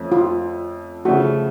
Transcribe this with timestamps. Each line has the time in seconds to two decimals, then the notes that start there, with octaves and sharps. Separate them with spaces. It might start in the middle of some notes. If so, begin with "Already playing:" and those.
Already playing: F2 F3 A3 C#4
0.12 F4
1.05 C#3 F3 A3 F#4